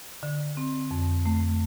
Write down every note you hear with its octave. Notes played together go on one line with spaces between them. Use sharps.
D3
C4
F2
A3